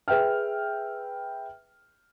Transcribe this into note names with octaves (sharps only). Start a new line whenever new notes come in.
G#4 B4 E5 G5 F6